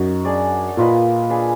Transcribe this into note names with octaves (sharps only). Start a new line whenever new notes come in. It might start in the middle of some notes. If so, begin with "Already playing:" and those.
Already playing: F#2 D#4 F#4
D4 G#4 D5
A#2 A#3 F4 B4 D#5
D4 G#4 B4 F5